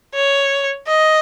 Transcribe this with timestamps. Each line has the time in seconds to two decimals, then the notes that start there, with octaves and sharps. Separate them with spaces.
0.15 C#5
0.88 D#5